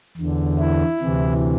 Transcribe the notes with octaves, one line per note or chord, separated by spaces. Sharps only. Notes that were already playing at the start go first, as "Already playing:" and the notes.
E2 D3
E4
D2 C3 E3